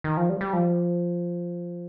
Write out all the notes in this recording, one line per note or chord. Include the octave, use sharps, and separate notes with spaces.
D#3
F3
G3
G3
F3